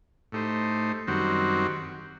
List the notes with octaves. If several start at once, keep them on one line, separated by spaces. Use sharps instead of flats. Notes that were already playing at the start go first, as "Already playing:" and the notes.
A2 A3 D#4 G4 C5
F#2 D#3 G3 C4 F#4